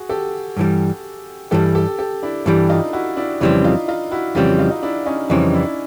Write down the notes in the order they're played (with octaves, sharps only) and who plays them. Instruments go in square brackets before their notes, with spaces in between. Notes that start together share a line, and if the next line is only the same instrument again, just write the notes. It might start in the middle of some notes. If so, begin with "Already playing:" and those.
Already playing: [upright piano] F#4 G#4
G4 A4
[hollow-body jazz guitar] G2 E3 G3
[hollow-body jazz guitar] G2 E3 G3 [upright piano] G4 A4
[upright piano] G4 A4
G4 A4
D4 E4
[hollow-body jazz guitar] G2 E3 G3 [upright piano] D4 E4
[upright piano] D#4 F4
E4 F#4
D4 E4
[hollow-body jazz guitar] F2 C#3 E3 G3 C4 [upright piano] D4 E4
[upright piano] D#4 F4
D#4 F4
E4 F#4
[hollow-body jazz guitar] F2 C#3 E3 G3 C4 [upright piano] F4 G4
[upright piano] D#4 F4
D#4
D4 E4
C#4 D#4
[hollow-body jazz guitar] F2 C#3 E3 G3 C4 [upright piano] C#4 D#4
[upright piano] D4 E4